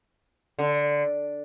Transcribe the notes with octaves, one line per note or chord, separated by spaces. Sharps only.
D3